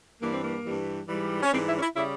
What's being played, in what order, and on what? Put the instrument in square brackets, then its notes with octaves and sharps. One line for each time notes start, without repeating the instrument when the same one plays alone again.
[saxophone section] G2 E3 G3 A#3
C4
A#3
G2 E3 G3
G#2 E3 G3
C#4
G#2 E3 G3 C4
E4
C#4
E4
C#3 G3 E4